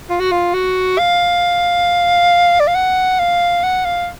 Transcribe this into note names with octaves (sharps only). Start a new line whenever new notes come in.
F4
F#4
F4
F#4
F5
D5
F5
F#5
F5
F#5
F5